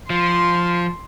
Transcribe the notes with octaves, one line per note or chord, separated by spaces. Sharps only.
F3 C6